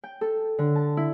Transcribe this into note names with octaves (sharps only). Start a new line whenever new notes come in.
G5
A4
D3
A5
E4